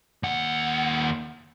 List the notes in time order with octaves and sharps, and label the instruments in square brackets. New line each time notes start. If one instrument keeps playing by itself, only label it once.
[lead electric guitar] D#2 F#5